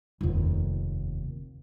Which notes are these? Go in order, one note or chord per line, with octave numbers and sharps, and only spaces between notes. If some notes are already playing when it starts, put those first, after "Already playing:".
F1 D#2